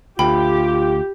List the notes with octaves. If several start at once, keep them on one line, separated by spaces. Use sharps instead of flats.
D2 F4 G4 G5 B5